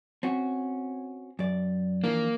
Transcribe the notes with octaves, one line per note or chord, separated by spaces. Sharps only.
C4 C#4 F#4
F#2 D5
E3 F3 A#3 D4